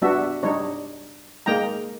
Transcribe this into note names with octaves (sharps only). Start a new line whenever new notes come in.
G3 B3 D4 F#4 E5
G3 D4 D#4 C#5
G#3 A#3 D#4 G5 A#5